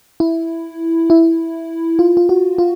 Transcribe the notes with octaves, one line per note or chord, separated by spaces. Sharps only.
E4
E4
F4
F4
F#4
F4